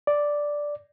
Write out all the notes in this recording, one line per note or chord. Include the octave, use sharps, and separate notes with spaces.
D5